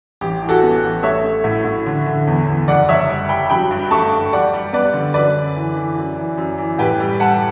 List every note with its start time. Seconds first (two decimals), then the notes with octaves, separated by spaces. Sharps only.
0.21 A1 G4
0.43 E3
0.49 F#4 A4
0.63 B3
0.83 A1
1.03 A3 C#5 E5
1.24 A3
1.44 A2
1.65 A2
1.86 D3
2.06 D3
2.27 E2
2.48 E2
2.68 F#1 D5 F#5
2.89 F#1 C#5 E5
3.09 G3
3.29 G3 G5 B5
3.50 F#3 G5 B5
3.71 G2
3.91 A3 A5 C#6
4.12 G2
4.33 G3 D5 F#5
4.53 G3
4.73 B3 B4 D5
4.93 D3
5.14 F#2 B4 D5
5.35 F#2
5.56 E3
5.76 E3
5.97 F#2
6.17 E3
6.37 F#2
6.58 E3
6.78 A2 G4 B4
7.00 G3
7.20 G3 F#5 A5